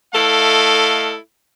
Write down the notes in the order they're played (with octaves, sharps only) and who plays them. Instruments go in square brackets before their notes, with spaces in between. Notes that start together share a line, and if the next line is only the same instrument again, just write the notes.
[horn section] A3 E4 A4 D#5 F5